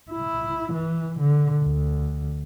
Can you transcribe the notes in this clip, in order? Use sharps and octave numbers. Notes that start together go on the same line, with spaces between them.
E4
E3
D3
D2